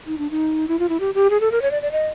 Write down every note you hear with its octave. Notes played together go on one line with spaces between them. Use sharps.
D#4
D4
D#4
E4
F4
E4
G4
G4
G#4
A4
A#4
C#5
D5
D5
D#5